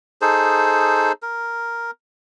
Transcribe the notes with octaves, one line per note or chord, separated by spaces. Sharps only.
D#4 G#4 A4 C5
A#4